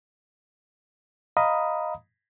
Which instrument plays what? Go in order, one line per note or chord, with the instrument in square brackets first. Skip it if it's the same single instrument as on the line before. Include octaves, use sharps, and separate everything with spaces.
[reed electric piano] D#5 F5 A#5 B5 D#6